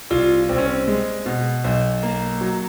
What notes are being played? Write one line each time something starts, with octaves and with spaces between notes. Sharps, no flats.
C2 F4
C2 C4
C#4
C4
G#3
B2
B1
A#3
F#3